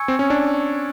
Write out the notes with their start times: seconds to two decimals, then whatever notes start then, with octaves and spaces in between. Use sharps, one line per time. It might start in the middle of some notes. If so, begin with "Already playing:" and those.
Already playing: G#5 C#6 E6 G#6 C#7
0.08 C4
0.19 C#4
0.30 D4